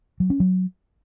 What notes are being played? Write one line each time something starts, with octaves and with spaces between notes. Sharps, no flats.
F#3
C#4
F#3